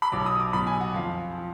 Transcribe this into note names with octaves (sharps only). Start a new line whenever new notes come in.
B5
B1 B2 F#3 D6
D#6
D6
B1 B2 F#3 B5
G#5
F#5
F2 F3 F5
F3